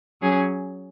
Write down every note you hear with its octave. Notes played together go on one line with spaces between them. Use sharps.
F#3 C#4 G#4